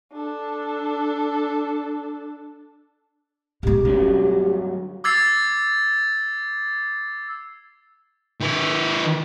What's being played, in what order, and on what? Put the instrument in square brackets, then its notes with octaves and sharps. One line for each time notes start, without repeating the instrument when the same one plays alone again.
[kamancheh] D4 A4
[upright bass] B2 G#3 [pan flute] G4
[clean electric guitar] G2 D3 F#3 [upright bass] C#4
[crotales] D6 E6 G#6 A6 C7
[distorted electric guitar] D#3 B4